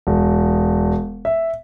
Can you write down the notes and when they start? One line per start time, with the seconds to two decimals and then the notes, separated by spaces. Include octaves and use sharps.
0.07 E1
1.25 E5